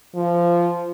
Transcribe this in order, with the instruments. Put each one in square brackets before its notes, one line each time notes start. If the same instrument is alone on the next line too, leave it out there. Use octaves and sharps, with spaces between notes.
[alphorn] F3